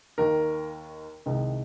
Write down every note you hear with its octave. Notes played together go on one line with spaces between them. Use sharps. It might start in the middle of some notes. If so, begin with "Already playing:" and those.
D#2 D#3 A#3 A#4
C2 C3 D#3 G#3